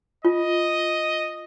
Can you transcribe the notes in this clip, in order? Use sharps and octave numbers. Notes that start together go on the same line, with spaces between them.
F4 D#5